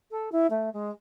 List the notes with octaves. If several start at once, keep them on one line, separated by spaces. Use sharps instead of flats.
A4
E4
A3
G#3